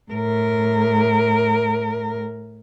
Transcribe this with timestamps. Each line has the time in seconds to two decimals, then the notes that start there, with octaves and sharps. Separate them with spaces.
0.11 A2 A#4